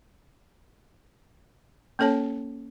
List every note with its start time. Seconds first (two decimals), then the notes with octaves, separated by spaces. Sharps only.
1.99 A#3 C#4 A4 C#5 A5